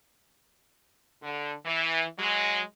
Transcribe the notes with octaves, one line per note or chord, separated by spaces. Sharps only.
D3
E3
F#3 G#3